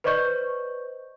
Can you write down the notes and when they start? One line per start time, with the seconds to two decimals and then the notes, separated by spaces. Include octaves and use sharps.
0.04 B4 C5 D5 D#5 C#6 G6